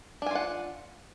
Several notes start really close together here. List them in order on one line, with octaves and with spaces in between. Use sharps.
D4 G#5 F4 F#5